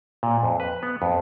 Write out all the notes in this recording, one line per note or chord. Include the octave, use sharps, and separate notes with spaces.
A#2
F2
B4
B3
F2